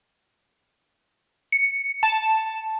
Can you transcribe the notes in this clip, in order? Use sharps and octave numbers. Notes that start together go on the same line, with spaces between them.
C#7
A5